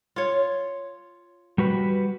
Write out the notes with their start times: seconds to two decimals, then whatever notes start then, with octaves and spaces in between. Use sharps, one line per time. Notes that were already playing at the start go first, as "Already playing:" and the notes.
0.16 F4 C#5
1.58 G3 F#4 B4